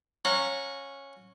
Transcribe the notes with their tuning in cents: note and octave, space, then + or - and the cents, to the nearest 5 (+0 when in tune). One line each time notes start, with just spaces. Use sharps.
C#4 -10 F#5 -45 A#5 -20